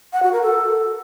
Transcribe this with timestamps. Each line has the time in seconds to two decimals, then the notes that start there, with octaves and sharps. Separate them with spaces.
0.13 F#5
0.23 F#4
0.32 A#4
0.42 A4